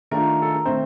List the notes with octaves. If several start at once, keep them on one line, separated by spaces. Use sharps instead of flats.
D#3 A3 D4 F4 A#4
A4
A#4
D#3 A3 C4 C5